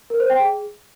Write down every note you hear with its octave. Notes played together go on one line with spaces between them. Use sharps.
A#4
C5
G5
G#4